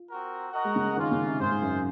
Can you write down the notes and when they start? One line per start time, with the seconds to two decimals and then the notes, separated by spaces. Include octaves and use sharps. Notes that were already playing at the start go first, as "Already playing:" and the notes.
Already playing: F4
0.10 C4 F#4 A#4
0.53 F#4 A#4 D#5 F#5
0.65 G#3
0.76 C#3
0.97 D#3 A#3 C#4 F4
1.12 C#3
1.26 C3
1.40 G#2 F4 G#4 C5
1.51 G#2
1.62 F#2